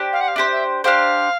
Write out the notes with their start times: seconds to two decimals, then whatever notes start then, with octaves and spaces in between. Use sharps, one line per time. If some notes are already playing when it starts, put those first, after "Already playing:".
Already playing: D4 G4 C5
0.12 F5
0.20 F#5
0.28 F5
0.36 D4 G4 C5 E5
0.52 E5
0.84 D4 G4 C5 F5